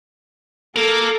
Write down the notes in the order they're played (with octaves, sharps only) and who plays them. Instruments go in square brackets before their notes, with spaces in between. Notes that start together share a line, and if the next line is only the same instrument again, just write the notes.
[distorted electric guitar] A#3 A#4 [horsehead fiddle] A4